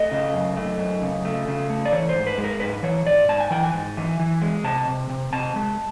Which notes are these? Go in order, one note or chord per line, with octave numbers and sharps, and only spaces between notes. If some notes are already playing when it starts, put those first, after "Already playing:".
Already playing: A3 D#5
C#3
F#2
A3
F#2
C#3
A3
C#3
A3
D5
E3 C#5
C5
G#2
B4
G#3
A#4
G#2 B4
E3 C#5
G#2 D5
G#2 A5
G#5
E3 G5
G#5
G#2
E3
E3
G#3
C3 A5
C3
C3
C3 A5
G#3